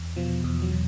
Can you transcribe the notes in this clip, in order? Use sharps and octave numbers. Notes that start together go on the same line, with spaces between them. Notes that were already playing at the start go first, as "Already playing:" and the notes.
Already playing: E2
B2 F3
E2 F3
F#3
B2